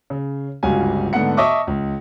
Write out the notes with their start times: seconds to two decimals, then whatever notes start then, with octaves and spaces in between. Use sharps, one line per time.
0.10 C#3
0.63 G1 C#2 G3 F#4 F5 G#5
1.13 G#2 D3 A3 B3 F#5 C#7
1.37 D#5 E5 A5 C#6 D6
1.67 C#2